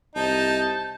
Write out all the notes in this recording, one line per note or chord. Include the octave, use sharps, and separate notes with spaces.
C2 D#4 A5 G6